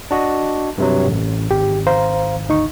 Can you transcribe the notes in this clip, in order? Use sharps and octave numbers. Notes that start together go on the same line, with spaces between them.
D4 F#4 D#5
G2 C3 F#3
A1
G#1 G4
C5 F5 A#5
D2 D#4 C#6